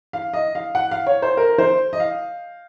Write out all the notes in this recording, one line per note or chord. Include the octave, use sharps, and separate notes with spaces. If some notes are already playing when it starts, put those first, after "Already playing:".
F5
D#5
F5
F#5
F5
C#5
C5
A#4
C5
D#5
F5